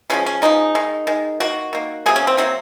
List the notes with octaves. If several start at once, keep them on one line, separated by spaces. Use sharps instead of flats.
C#3 F3 G#3 C#4
C#4
C#3 F3 G#3 D#4
D#3 G#3
D#3 G#3
D#3 A#3 F#4
D#3 A#3
C3 F#3 A#3 G#4
C#4
C4
C3 F#3 A#3 C4